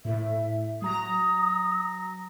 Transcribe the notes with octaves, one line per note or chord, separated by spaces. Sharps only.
A2 E5
F#3 A#5 D#6 A#6